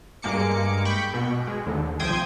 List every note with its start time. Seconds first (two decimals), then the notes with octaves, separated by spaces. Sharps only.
0.22 G2 G#3 A#3 D6 C#7
0.85 G5 B5 C#6
1.13 B2
1.47 G#3
1.66 D#2 D3
2.00 C2 F3 C5 G5 D#6 G#6